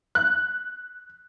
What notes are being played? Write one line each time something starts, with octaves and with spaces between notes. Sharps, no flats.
F#6